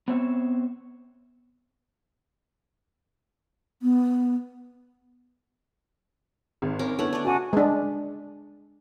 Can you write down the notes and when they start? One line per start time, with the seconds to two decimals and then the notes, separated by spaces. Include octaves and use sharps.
0.08 B3 C4 C#5 E5
3.82 B3
6.62 G#1
6.79 C#4 A#4 D6
6.99 D3 A3 B3 E4 C#5 F#5
7.13 D4 D5
7.25 C#3 F#4 G#5 A5 D6
7.53 G#3 D4